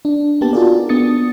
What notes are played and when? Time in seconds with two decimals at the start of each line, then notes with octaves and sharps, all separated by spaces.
0.05 D4
0.41 A#3 B3 G4 A5
0.53 D#4 F4 F#4 G#4 A#4 D5
0.89 B3 D4 D#6 A6 C#7